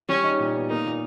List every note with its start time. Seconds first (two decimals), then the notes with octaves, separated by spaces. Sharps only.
0.09 G3 C#4
0.24 D#4
0.40 A#2
0.55 B3
0.70 A#3 D#4
0.86 A#2